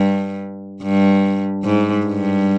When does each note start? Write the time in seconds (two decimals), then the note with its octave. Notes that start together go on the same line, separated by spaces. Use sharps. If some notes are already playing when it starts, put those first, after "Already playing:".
Already playing: G2
0.83 G2
1.65 G#2
2.06 G2